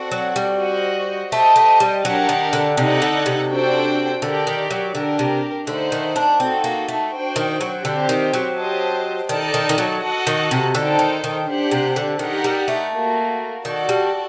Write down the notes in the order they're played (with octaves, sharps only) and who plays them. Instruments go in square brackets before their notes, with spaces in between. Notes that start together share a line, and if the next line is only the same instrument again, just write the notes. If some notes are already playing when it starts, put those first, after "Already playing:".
Already playing: [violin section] C4 F#4 A4 D5 F#5
[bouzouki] F#3
G3
[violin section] F#4 C5 D#5 F#5
[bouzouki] A3 [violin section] G4 C5 D#5 G5
[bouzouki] A3
G3
[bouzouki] F#3 [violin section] D4 G4 A#4 F#5 A5
[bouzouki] D#3
D3
[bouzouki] C3 [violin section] D#4 A4 D5 F#5
[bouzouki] D3
C3
[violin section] D4 F#4 A4 C5 G5
[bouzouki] D3 [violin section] G4 A#4 D5
[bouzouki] D#3
F#3
[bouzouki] D3 [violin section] D4 G4 A#4
[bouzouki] C3
[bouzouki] D3 [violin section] A3 D#4 A4 C5 F#5
[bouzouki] D#3
D4
[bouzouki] C4 [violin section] D#4 F#4 A4
[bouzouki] A#3
A3
[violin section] D4 F#4 C5 G5
[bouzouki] D#3
F#3
[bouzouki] D3 [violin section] C4 G4 C5
[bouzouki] D#3
F#3
[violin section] G4 C5 D#5 A5
[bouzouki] D#3 [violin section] D#4 A4 D5 A5
[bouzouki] D#3
D#3
F#3
[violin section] F#4 A4 D#5 F#5 A5
[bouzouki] D#3
C3
[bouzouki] D3 [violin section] D#4 A4 C5 G5
[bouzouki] D#3
D#3
[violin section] D4 G4 C5 F#5
[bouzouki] C3
D3
[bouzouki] D#3 [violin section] D#4 G4 A#4 F#5
[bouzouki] G3
A3
[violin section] A#3 F#4 A#4
[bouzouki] D#3 [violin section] F#4 A4 D5 F#5 A5
[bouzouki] G3